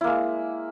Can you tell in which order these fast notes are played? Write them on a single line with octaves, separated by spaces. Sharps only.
E4 A#3 G#3